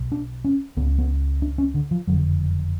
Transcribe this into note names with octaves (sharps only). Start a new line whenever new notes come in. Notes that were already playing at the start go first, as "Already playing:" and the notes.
Already playing: B1 B2
D4
C#4
C#2 C#3 B3
B3
D4
C#4
D3
F3
F#1 F2 D3 F#3